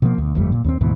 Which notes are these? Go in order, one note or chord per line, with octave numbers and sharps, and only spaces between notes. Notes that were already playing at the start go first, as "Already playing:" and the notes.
B2 F3 A#3
D2
G1 F2 G3 A3
A#2
D#2 B3 C4
D2 G#2 B2 E3